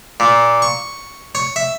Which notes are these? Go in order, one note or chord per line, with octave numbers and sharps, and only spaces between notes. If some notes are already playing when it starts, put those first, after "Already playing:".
A#2
C#6
C#5
E5